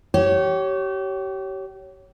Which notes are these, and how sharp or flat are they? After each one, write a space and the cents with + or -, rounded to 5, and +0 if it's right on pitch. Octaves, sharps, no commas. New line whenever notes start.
G4 -30 C#5 +0